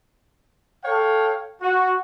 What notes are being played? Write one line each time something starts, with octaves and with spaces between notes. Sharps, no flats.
A4 C#5 F5 G5
F#4